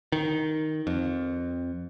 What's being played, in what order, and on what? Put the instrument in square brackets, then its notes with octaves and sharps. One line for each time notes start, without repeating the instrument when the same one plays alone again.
[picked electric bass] D#3
F2